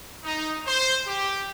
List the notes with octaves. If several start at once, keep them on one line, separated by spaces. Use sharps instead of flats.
D#4
C5
G4